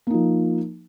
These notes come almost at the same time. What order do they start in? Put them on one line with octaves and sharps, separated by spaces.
A#3 D#4 F3